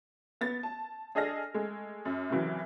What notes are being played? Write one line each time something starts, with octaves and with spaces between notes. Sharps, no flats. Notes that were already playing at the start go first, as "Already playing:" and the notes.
B3 A6
A5
D4 G#4 A4 D#5 F6 A#6
G#3 A3
F#2
C2 C#3 E3 F#3